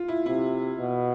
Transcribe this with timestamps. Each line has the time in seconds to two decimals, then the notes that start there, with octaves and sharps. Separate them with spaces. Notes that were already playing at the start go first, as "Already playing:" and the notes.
Already playing: F4
0.08 E4
0.26 C3 E4
0.78 B2